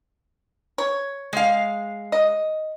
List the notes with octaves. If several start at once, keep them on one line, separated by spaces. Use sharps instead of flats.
C#5
G#3 F5
D#5